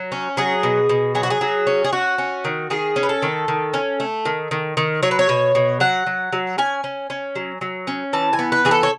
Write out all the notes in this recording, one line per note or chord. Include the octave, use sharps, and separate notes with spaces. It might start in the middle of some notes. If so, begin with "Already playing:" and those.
Already playing: F#3
C#4
F#3 G#4
B2
B2
F#3 G#4
F#4
G#4
F#3
C#4
G#4
C#4 F#4
C#4
D#3
D#3 G#4
C#4
B4
A4
D#3
D#3
C#4
A3
D#3
D#3
D#3
F#3 C#5
B4
C#5
B2
B2
F#3 F#5
F#3
F#3
C#4 G#5
C#4
C#4
F#3
F#3
C#4
E3 A5
G#5
B3
B4
E3 G#4
A4
C#5